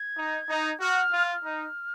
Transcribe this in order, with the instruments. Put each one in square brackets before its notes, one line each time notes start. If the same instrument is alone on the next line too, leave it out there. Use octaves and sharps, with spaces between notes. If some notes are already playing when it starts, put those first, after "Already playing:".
Already playing: [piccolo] G#6
[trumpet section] D#4
D#4
[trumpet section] F#4 [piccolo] F6
[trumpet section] F4
[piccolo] F6
[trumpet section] D#4